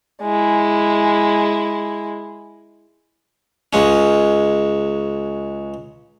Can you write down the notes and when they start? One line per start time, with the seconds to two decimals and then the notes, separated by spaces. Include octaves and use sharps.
0.23 G#3 E4
3.73 C#2 G#3 C#4